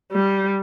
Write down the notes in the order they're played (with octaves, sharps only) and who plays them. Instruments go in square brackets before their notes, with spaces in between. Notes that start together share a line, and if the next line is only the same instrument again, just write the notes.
[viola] G3